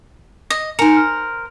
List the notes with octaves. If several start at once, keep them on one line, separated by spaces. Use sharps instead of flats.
D#5
D#4 A#4 C5 G#5 C#7
F6